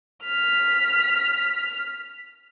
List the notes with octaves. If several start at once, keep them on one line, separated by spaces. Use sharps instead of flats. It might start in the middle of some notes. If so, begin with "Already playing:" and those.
F6 B6